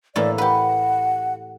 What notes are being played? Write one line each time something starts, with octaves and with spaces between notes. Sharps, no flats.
A2 E3 A#3 D5
G4 B4 F#5